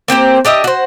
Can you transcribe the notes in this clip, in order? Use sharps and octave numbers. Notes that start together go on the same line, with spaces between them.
A#3 C4 G4 C5
D4 G4 D#5 E5
F#4 C5